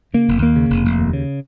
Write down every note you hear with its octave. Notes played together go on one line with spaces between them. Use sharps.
C#3 A#3
F1
D#2 A#3
C#3
F1
F1
D#2
C#3